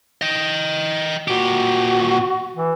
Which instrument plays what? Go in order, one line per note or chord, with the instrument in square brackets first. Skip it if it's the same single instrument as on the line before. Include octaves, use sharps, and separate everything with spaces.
[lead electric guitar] D#5 G5
[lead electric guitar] A#2 G4 [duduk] F#4
[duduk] E3